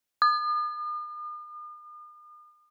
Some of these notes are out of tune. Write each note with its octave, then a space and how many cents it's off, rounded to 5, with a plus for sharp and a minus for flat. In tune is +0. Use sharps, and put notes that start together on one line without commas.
D#6 -45